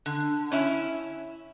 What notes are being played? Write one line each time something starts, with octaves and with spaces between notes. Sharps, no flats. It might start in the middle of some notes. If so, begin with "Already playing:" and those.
D3
C#4 E4 E5